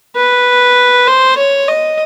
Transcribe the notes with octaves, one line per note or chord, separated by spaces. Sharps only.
B4
C5
C#5
D#5